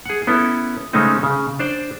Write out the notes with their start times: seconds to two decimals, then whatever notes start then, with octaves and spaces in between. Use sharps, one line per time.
0.06 G#4 F#5
0.27 B3 C#4 E4 A4
0.93 C#3 G#3 A3 C4 C#4 D#4
1.23 C#3
1.59 D4 C5 D5